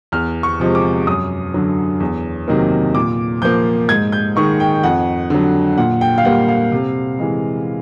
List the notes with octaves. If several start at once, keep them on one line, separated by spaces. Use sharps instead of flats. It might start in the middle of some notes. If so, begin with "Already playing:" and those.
E2 F6
C#6
C3 F3 G#3
D6
F#2 D#6
D3 F#3
E2
C3 D#3 F#3 A#3
A#2 D6
F3 A#3 G6
G#2 G#6
G6
D#3 G#3 C#6
G5
F2 F#5
D3 F#3
A#2 F#5
G5
F5
G3 A#3 F#5
F5
C3
E3 G#3